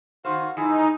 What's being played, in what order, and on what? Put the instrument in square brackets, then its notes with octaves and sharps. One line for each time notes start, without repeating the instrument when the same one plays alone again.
[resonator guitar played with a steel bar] D#3 D#4 C5 [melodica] F#4 F5
[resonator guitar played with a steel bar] F2 E3 [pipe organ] D#4 [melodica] G#4